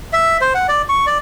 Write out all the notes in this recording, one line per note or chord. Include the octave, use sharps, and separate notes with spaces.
E5
C5
F#5
D5
C#6
D5